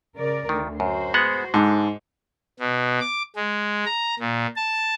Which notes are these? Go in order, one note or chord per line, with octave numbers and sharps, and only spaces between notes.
C#3 A#4 D5
D2 D#3
F#2 F#4 C5
G#3 B3 F#5
G#2 D3
B2
D6
G#3
A#5
A#2
A5